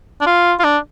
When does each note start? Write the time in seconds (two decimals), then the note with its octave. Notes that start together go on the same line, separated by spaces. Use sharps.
0.21 D4
0.27 F4
0.60 F4
0.64 D4